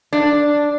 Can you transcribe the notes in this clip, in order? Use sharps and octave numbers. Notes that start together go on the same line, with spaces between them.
D4